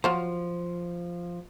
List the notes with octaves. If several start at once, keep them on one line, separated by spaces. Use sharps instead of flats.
F3 F#3 F4 C5